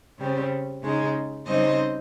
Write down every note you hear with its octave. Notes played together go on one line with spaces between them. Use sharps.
C#3 G3 C4
C#3 G#3 D#4
C#3 G3 C4 D#4 C5 D#5